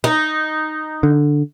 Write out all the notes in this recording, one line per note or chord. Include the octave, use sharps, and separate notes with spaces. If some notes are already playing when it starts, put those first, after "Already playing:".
D#4
D3